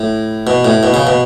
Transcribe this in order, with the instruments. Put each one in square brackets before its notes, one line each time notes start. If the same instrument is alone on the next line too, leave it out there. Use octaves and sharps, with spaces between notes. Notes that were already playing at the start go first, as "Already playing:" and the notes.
Already playing: [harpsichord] A2
B2
A2
B2
C#3
B2